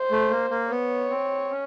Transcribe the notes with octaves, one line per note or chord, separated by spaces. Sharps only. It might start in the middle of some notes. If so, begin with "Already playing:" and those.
Already playing: C5
A3
A#3
A#3
B3 C#5
C4
C#4